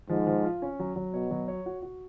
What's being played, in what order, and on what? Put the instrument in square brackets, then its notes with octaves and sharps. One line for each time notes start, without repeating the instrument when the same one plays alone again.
[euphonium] G#2 [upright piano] F3
[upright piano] F3
F4
C#4
F#3
F#3
[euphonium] B2 [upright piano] C#5
[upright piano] F#3
C#5
F#4
F#4